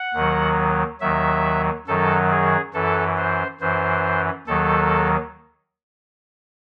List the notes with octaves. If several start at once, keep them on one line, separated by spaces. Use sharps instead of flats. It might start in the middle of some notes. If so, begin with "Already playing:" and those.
Already playing: F#5
D#2 D#3 F#3
D#2 D#3 F#3 E5
F#2 D#3 F#3 A4
G#4
F#2 E3 A4
C5
F#2 E3 C5
D#2 D#3 F#3 A4